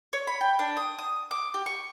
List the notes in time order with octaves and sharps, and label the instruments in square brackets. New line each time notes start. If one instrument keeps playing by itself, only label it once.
[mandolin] C#5
B5
G5
D4
D#6
D#6
D6
G4
C#6